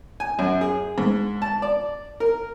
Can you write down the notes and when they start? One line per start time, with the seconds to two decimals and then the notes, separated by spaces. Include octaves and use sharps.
0.20 G#5
0.39 F#2
0.61 G#4
0.98 G#2
1.42 A5
1.62 D5
2.20 A#4